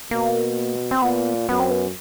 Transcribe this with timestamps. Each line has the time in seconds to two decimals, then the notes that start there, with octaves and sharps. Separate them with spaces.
0.11 B2 A#3
0.91 C4
1.02 A#2 B3
1.49 F#2 B3
1.60 C4
1.71 B3